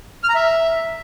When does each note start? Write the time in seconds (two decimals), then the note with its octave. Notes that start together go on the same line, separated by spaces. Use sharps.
0.24 F6
0.29 A#5
0.35 E5